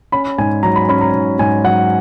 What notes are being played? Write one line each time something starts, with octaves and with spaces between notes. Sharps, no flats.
C#4 B5
G#2 G#5
F#3 A#5
B5
C#4 B5
A#5
G#2
G#2 G#5
F#3 F#5